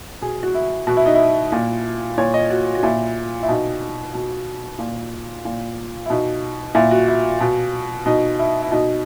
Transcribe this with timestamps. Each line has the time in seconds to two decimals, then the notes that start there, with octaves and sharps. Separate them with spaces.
0.21 B2 G#4
0.43 F#4
0.55 E4
0.87 B2 F#4
0.97 E4
1.06 D#4
1.15 E4
1.52 A#2
2.18 A#2 C#5
2.34 D#5
2.50 F#4
2.75 F#4
2.83 A#2 E4
3.43 E4
3.48 B2 D#4
4.14 B2
4.79 A#2
5.45 A#2
6.06 E4
6.10 B2 D#4
6.75 A#2 E4
6.91 F#4
7.08 E4
7.40 B2
8.06 B2 D#4
8.39 E4
8.62 E4
8.71 B2 D#4